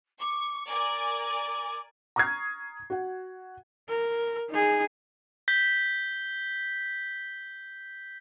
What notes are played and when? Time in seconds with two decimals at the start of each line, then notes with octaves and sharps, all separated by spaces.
0.21 C#6 D6
0.68 A#4 D5 G#5 D6
2.16 A#5 C#6 D#6 F6 G#6 C7
2.90 F#4 F#5
3.89 A#4
4.50 D#4 G#4
5.48 G6 B6 G7